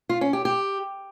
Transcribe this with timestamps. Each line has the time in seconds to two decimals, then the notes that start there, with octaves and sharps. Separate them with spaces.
0.09 F4
0.21 C#4
0.33 G4
0.45 G4